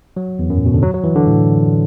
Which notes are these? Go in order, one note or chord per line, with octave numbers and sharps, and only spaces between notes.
F#3
E2
F#2
A2
B2
D3
F#3
F#3
E3
D3
A2